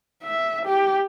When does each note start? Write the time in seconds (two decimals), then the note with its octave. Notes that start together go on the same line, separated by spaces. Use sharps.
0.23 E5
0.66 G4